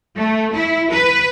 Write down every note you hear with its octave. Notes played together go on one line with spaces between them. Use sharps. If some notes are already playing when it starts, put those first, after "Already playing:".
A3
E4
B4